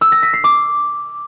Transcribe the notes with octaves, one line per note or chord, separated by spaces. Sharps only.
E6
A#6
B6
C7
D6